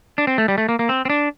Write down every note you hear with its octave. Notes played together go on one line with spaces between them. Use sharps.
D4
C4
A3
G3
A3
A#3
A#3
C4
C4
D4